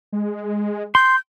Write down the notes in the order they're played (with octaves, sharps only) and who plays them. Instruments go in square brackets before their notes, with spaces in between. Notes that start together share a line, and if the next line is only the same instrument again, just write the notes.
[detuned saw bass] G#3
[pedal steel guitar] C6 [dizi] G6